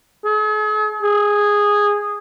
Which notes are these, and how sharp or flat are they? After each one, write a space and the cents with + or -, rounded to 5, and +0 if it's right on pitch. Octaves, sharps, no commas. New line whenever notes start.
G#4 +45
G#4 -10